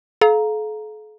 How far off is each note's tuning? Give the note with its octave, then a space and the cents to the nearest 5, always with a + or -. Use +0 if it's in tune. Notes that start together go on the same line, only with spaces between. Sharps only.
A4 -45 F5 +5 A#5 +0